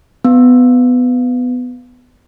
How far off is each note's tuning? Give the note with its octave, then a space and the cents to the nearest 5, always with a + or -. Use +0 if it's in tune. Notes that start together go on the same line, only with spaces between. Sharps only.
B3 +15